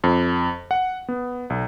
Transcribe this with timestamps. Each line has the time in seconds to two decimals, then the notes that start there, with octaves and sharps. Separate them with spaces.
0.04 F2
0.71 F#5
1.09 B3
1.50 B1